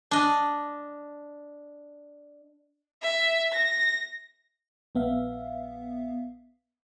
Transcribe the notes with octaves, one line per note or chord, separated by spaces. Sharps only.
D4 D#5
E5
A#6
A#1 B3 E5 F5